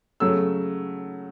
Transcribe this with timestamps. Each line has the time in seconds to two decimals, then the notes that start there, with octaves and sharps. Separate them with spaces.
0.20 C#3 F#3 A3 E6